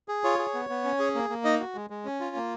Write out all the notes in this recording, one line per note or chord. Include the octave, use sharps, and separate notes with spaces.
G#4
F4 C#5
G#4
B3
B3
C#4
G#4
A#3
A#3
D#4 D#5
F#4
G#3
G#3
C#4
F4
A#3